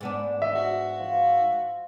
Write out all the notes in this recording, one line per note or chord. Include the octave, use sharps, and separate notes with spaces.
G#2 B3 D4
D#5 E5
F#4
F3